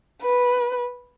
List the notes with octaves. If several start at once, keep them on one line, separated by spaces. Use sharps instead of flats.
B4